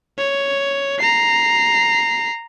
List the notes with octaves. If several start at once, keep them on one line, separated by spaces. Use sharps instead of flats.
C#5
A#5 C7